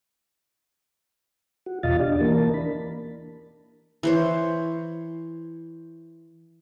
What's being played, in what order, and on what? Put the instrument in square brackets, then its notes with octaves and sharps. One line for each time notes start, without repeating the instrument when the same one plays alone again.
[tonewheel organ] F#4
E2 B2 F4 D#5 F5 A6
D4 G4 D5 D#5
E3 A#3 A#4 A5
D4 B5
[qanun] E3 C5 C#5